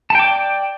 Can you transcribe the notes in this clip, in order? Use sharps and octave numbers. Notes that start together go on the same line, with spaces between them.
D5 G5 A5 D6